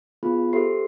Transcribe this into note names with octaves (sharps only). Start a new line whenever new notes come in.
B3 E4 F4 G#4 B5
G4 A4 C5 E5 C6 C7